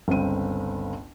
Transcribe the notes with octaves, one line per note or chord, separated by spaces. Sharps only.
G1 C#2 C4 D#7